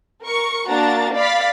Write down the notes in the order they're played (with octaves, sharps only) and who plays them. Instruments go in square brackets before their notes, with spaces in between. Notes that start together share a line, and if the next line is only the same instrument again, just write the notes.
[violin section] A#4 C#6
A#3 D4 F#4 A#5 A6
D5 F5 B5 A6 B6